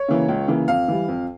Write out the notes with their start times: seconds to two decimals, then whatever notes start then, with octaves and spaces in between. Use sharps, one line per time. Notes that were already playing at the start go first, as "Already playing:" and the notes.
Already playing: C#5
0.08 C#3 E3 A#3
0.29 C#2
0.48 C#3 E3 A#3
0.68 F2 F5
0.88 E3 G3
1.08 F2